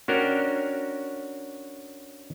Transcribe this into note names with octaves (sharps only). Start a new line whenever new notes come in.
C#4 D4 F#4 A#4 C#5 G5